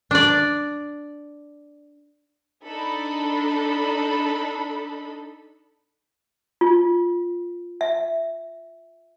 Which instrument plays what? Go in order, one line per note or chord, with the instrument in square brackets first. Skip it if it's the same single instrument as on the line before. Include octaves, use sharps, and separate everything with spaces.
[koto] D4 D5
[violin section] D4 D#4 A4 B5
[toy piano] F4
E5